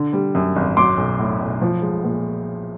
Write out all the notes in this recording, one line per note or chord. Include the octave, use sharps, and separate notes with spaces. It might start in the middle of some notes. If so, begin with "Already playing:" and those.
Already playing: D3
G3
F#2
G#1
F#3 C6 D6
B1
A2
B1
F3
G#3
A#2